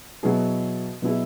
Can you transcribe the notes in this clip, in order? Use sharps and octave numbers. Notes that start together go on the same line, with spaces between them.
B2 F#3 B3 E4 G#4
B2 F#3 B3 E4 G#4